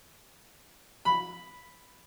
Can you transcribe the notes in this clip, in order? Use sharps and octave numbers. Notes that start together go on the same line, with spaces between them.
B5